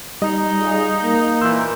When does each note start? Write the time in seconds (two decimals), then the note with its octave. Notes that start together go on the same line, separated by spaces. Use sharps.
0.22 G3 D#4 D#5
0.58 F4 G#4 D5
1.02 A#3
1.41 A#2 D#3 E3 C6 E6 G6